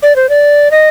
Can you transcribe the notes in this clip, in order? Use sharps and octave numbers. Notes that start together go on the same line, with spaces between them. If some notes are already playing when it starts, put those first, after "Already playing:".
D5
C5
D5
D#5